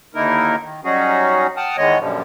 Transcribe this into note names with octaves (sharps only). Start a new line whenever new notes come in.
D#2 D3 A#3 D#4 E4 A#4
D#3
F#3 G3 C#4 D#4 F#4 G#4
F#5 G5 A5 D#6 F6
E2 D#3 G#3 B3 C#5 D#5
F#2 A#2 D3 F3 G3